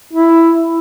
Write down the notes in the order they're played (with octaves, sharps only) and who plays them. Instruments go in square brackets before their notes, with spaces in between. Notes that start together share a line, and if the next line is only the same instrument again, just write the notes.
[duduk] E4